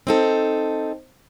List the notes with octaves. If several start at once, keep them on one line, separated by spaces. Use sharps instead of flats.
C4 D#4 A4